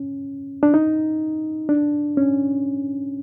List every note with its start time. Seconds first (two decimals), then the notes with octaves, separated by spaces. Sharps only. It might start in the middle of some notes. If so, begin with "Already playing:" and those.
Already playing: C#4
0.63 D4
0.74 D#4
1.69 D4
2.17 C#4